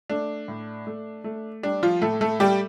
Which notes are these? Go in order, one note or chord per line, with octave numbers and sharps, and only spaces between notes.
A3 D4
A2
A3
A3
G3 D4
F3 F4
A2 A3 A4
A3 A4
G3 A3 G4